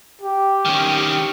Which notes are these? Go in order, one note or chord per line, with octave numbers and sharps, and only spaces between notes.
G4
D#3 C#4